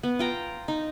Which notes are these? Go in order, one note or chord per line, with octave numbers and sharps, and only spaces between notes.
B3
F4 G5 A#5
D#4